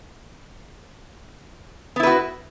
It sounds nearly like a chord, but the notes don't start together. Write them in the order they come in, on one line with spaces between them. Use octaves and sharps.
B3 E4 B4 F#4